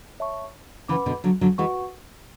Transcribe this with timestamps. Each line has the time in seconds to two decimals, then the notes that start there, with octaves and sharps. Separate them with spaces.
0.20 C#5 E5 A5 C#6
0.88 C#3 E3 B4 F#5 B5 D6
1.06 B2 D3
1.24 D3 F#3
1.41 D3 F#3
1.58 E3 G#3 F#4 B4 F#5 C#6